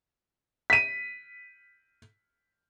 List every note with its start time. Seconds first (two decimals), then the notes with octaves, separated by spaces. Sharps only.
0.70 B6 D#7